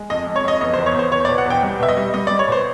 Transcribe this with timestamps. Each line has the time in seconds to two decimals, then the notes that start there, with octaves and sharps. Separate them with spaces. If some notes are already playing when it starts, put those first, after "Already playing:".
Already playing: G#3
0.10 F2 D#5
0.27 F2
0.36 C#5
0.44 F2 D#5
0.61 E2 D#5
0.74 C5
0.78 E2
0.86 C#5
0.95 E2 C5
1.12 E2 C#5
1.25 B2 D5
1.38 F#5
1.46 E2 G5
1.63 G3
1.80 B2 E5
1.88 D#5
1.97 G3
2.14 G3 D#5
2.27 G3 D5
2.39 C#5
2.48 B2 C5